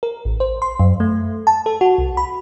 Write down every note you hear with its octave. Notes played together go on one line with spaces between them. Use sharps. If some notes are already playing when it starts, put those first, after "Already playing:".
A#4
A1
C5
C6
F#2
A3
A5
A4
F#4
C2
B5